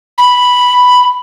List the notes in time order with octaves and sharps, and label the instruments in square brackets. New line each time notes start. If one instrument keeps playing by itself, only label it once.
[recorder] B5